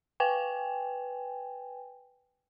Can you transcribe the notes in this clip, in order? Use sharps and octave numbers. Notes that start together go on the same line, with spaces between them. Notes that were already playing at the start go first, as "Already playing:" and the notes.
B4 G5 G#5